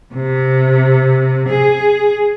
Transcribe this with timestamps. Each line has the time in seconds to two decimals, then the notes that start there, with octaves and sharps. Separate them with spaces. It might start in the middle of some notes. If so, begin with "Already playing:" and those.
0.14 C3
1.49 G#4